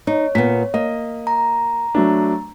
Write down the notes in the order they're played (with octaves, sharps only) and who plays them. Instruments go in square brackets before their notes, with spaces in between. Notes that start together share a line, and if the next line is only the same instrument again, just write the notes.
[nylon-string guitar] D#4 [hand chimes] C#5
[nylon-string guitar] A#2 B3 [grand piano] B6
[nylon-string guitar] A#3 [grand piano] D#5
[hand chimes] A#5
[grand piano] F#3 A3 D4